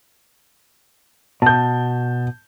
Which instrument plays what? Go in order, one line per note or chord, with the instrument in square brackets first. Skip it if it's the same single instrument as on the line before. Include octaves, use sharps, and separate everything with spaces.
[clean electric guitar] B2 [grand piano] A5 G6